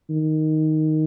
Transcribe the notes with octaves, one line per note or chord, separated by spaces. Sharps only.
D#3